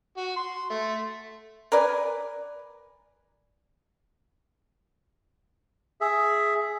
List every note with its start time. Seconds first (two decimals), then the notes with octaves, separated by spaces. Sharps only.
0.17 F#4
0.36 C6
0.70 A3
1.72 A#4 B4 D5 G#5
6.01 G#4 E5